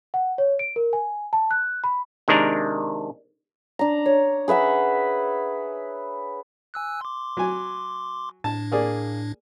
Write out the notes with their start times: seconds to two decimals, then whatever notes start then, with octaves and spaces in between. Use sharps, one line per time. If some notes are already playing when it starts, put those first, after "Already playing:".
0.14 F#5
0.38 C#5
0.59 D7
0.76 A#4
0.93 G#5
1.33 A5
1.51 F#6
1.84 B5
2.28 C3 D#3 G#3 D4 A#4
3.79 D4 A#5
4.06 C#5
4.48 G#4 B4 E5 F#5
6.74 G#5 E6 F#6
7.01 C6 D6
7.37 F#3 G#5
8.44 A2 D4 A5
8.72 A#3 G#4 D5